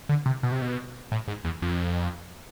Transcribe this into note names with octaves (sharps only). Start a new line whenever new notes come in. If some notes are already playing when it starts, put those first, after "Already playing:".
D3
C3
B2
C3
B2
A2
G#2
E2
F2